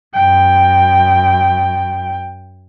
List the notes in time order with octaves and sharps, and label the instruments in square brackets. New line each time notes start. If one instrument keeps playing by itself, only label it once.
[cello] F#2 G5